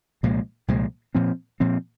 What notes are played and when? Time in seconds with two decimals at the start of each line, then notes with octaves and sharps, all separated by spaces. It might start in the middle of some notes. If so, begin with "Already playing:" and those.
0.23 C2 A#2 F3 G#3
0.68 C2 A#2 F3 G#3
1.15 A#2 F3 C4
1.60 A#2 F3 C4